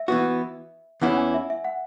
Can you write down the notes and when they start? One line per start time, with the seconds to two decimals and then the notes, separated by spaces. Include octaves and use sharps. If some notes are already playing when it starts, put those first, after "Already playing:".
Already playing: E5
0.08 E3 B3 F#4
1.02 E2 E3 C#4 E4 F#5
1.17 G#5
1.34 E5
1.50 E5
1.65 F#5